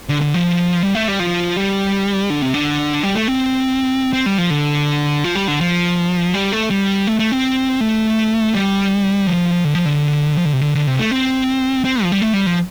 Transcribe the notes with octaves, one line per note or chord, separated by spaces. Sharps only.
D3
D3
F3
G3
A3
G3
F3
G3
D3
C3
D3
G3
A3
C4
C4
G3
F3
D3
F3
G3
D3
F3
G3
A3
G3
A3
A3
C4
A3
G3
F3
D3
F3
D3
F3
D3
C3
D3
D3
C3
A3
C4
C4
F3
G3
A3
G3
F3